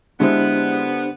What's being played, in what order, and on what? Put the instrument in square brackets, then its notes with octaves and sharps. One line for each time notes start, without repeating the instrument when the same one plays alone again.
[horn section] D3 B3 [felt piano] G#3 E4 [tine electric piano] D4 G4 C5